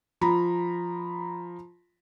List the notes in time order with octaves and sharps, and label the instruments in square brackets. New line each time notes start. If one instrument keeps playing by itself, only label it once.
[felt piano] F3 A#5 B5